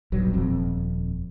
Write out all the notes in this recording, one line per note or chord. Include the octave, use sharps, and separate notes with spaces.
D#1 B1 G2 F#3
D#1 F2 C4